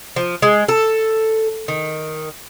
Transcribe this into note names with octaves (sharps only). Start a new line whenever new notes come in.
F3
G#3
A4
D#3